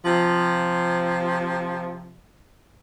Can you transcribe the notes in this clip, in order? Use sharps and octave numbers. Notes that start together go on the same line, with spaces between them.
C3 F3